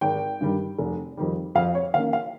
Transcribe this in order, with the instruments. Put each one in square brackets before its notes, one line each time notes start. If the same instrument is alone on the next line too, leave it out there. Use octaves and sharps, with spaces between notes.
[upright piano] G#1 G5
G2 D#3 G3
F1
F2 D#3 G3
F2 F5
C#5
D#3 A#3 C#4 F5
F5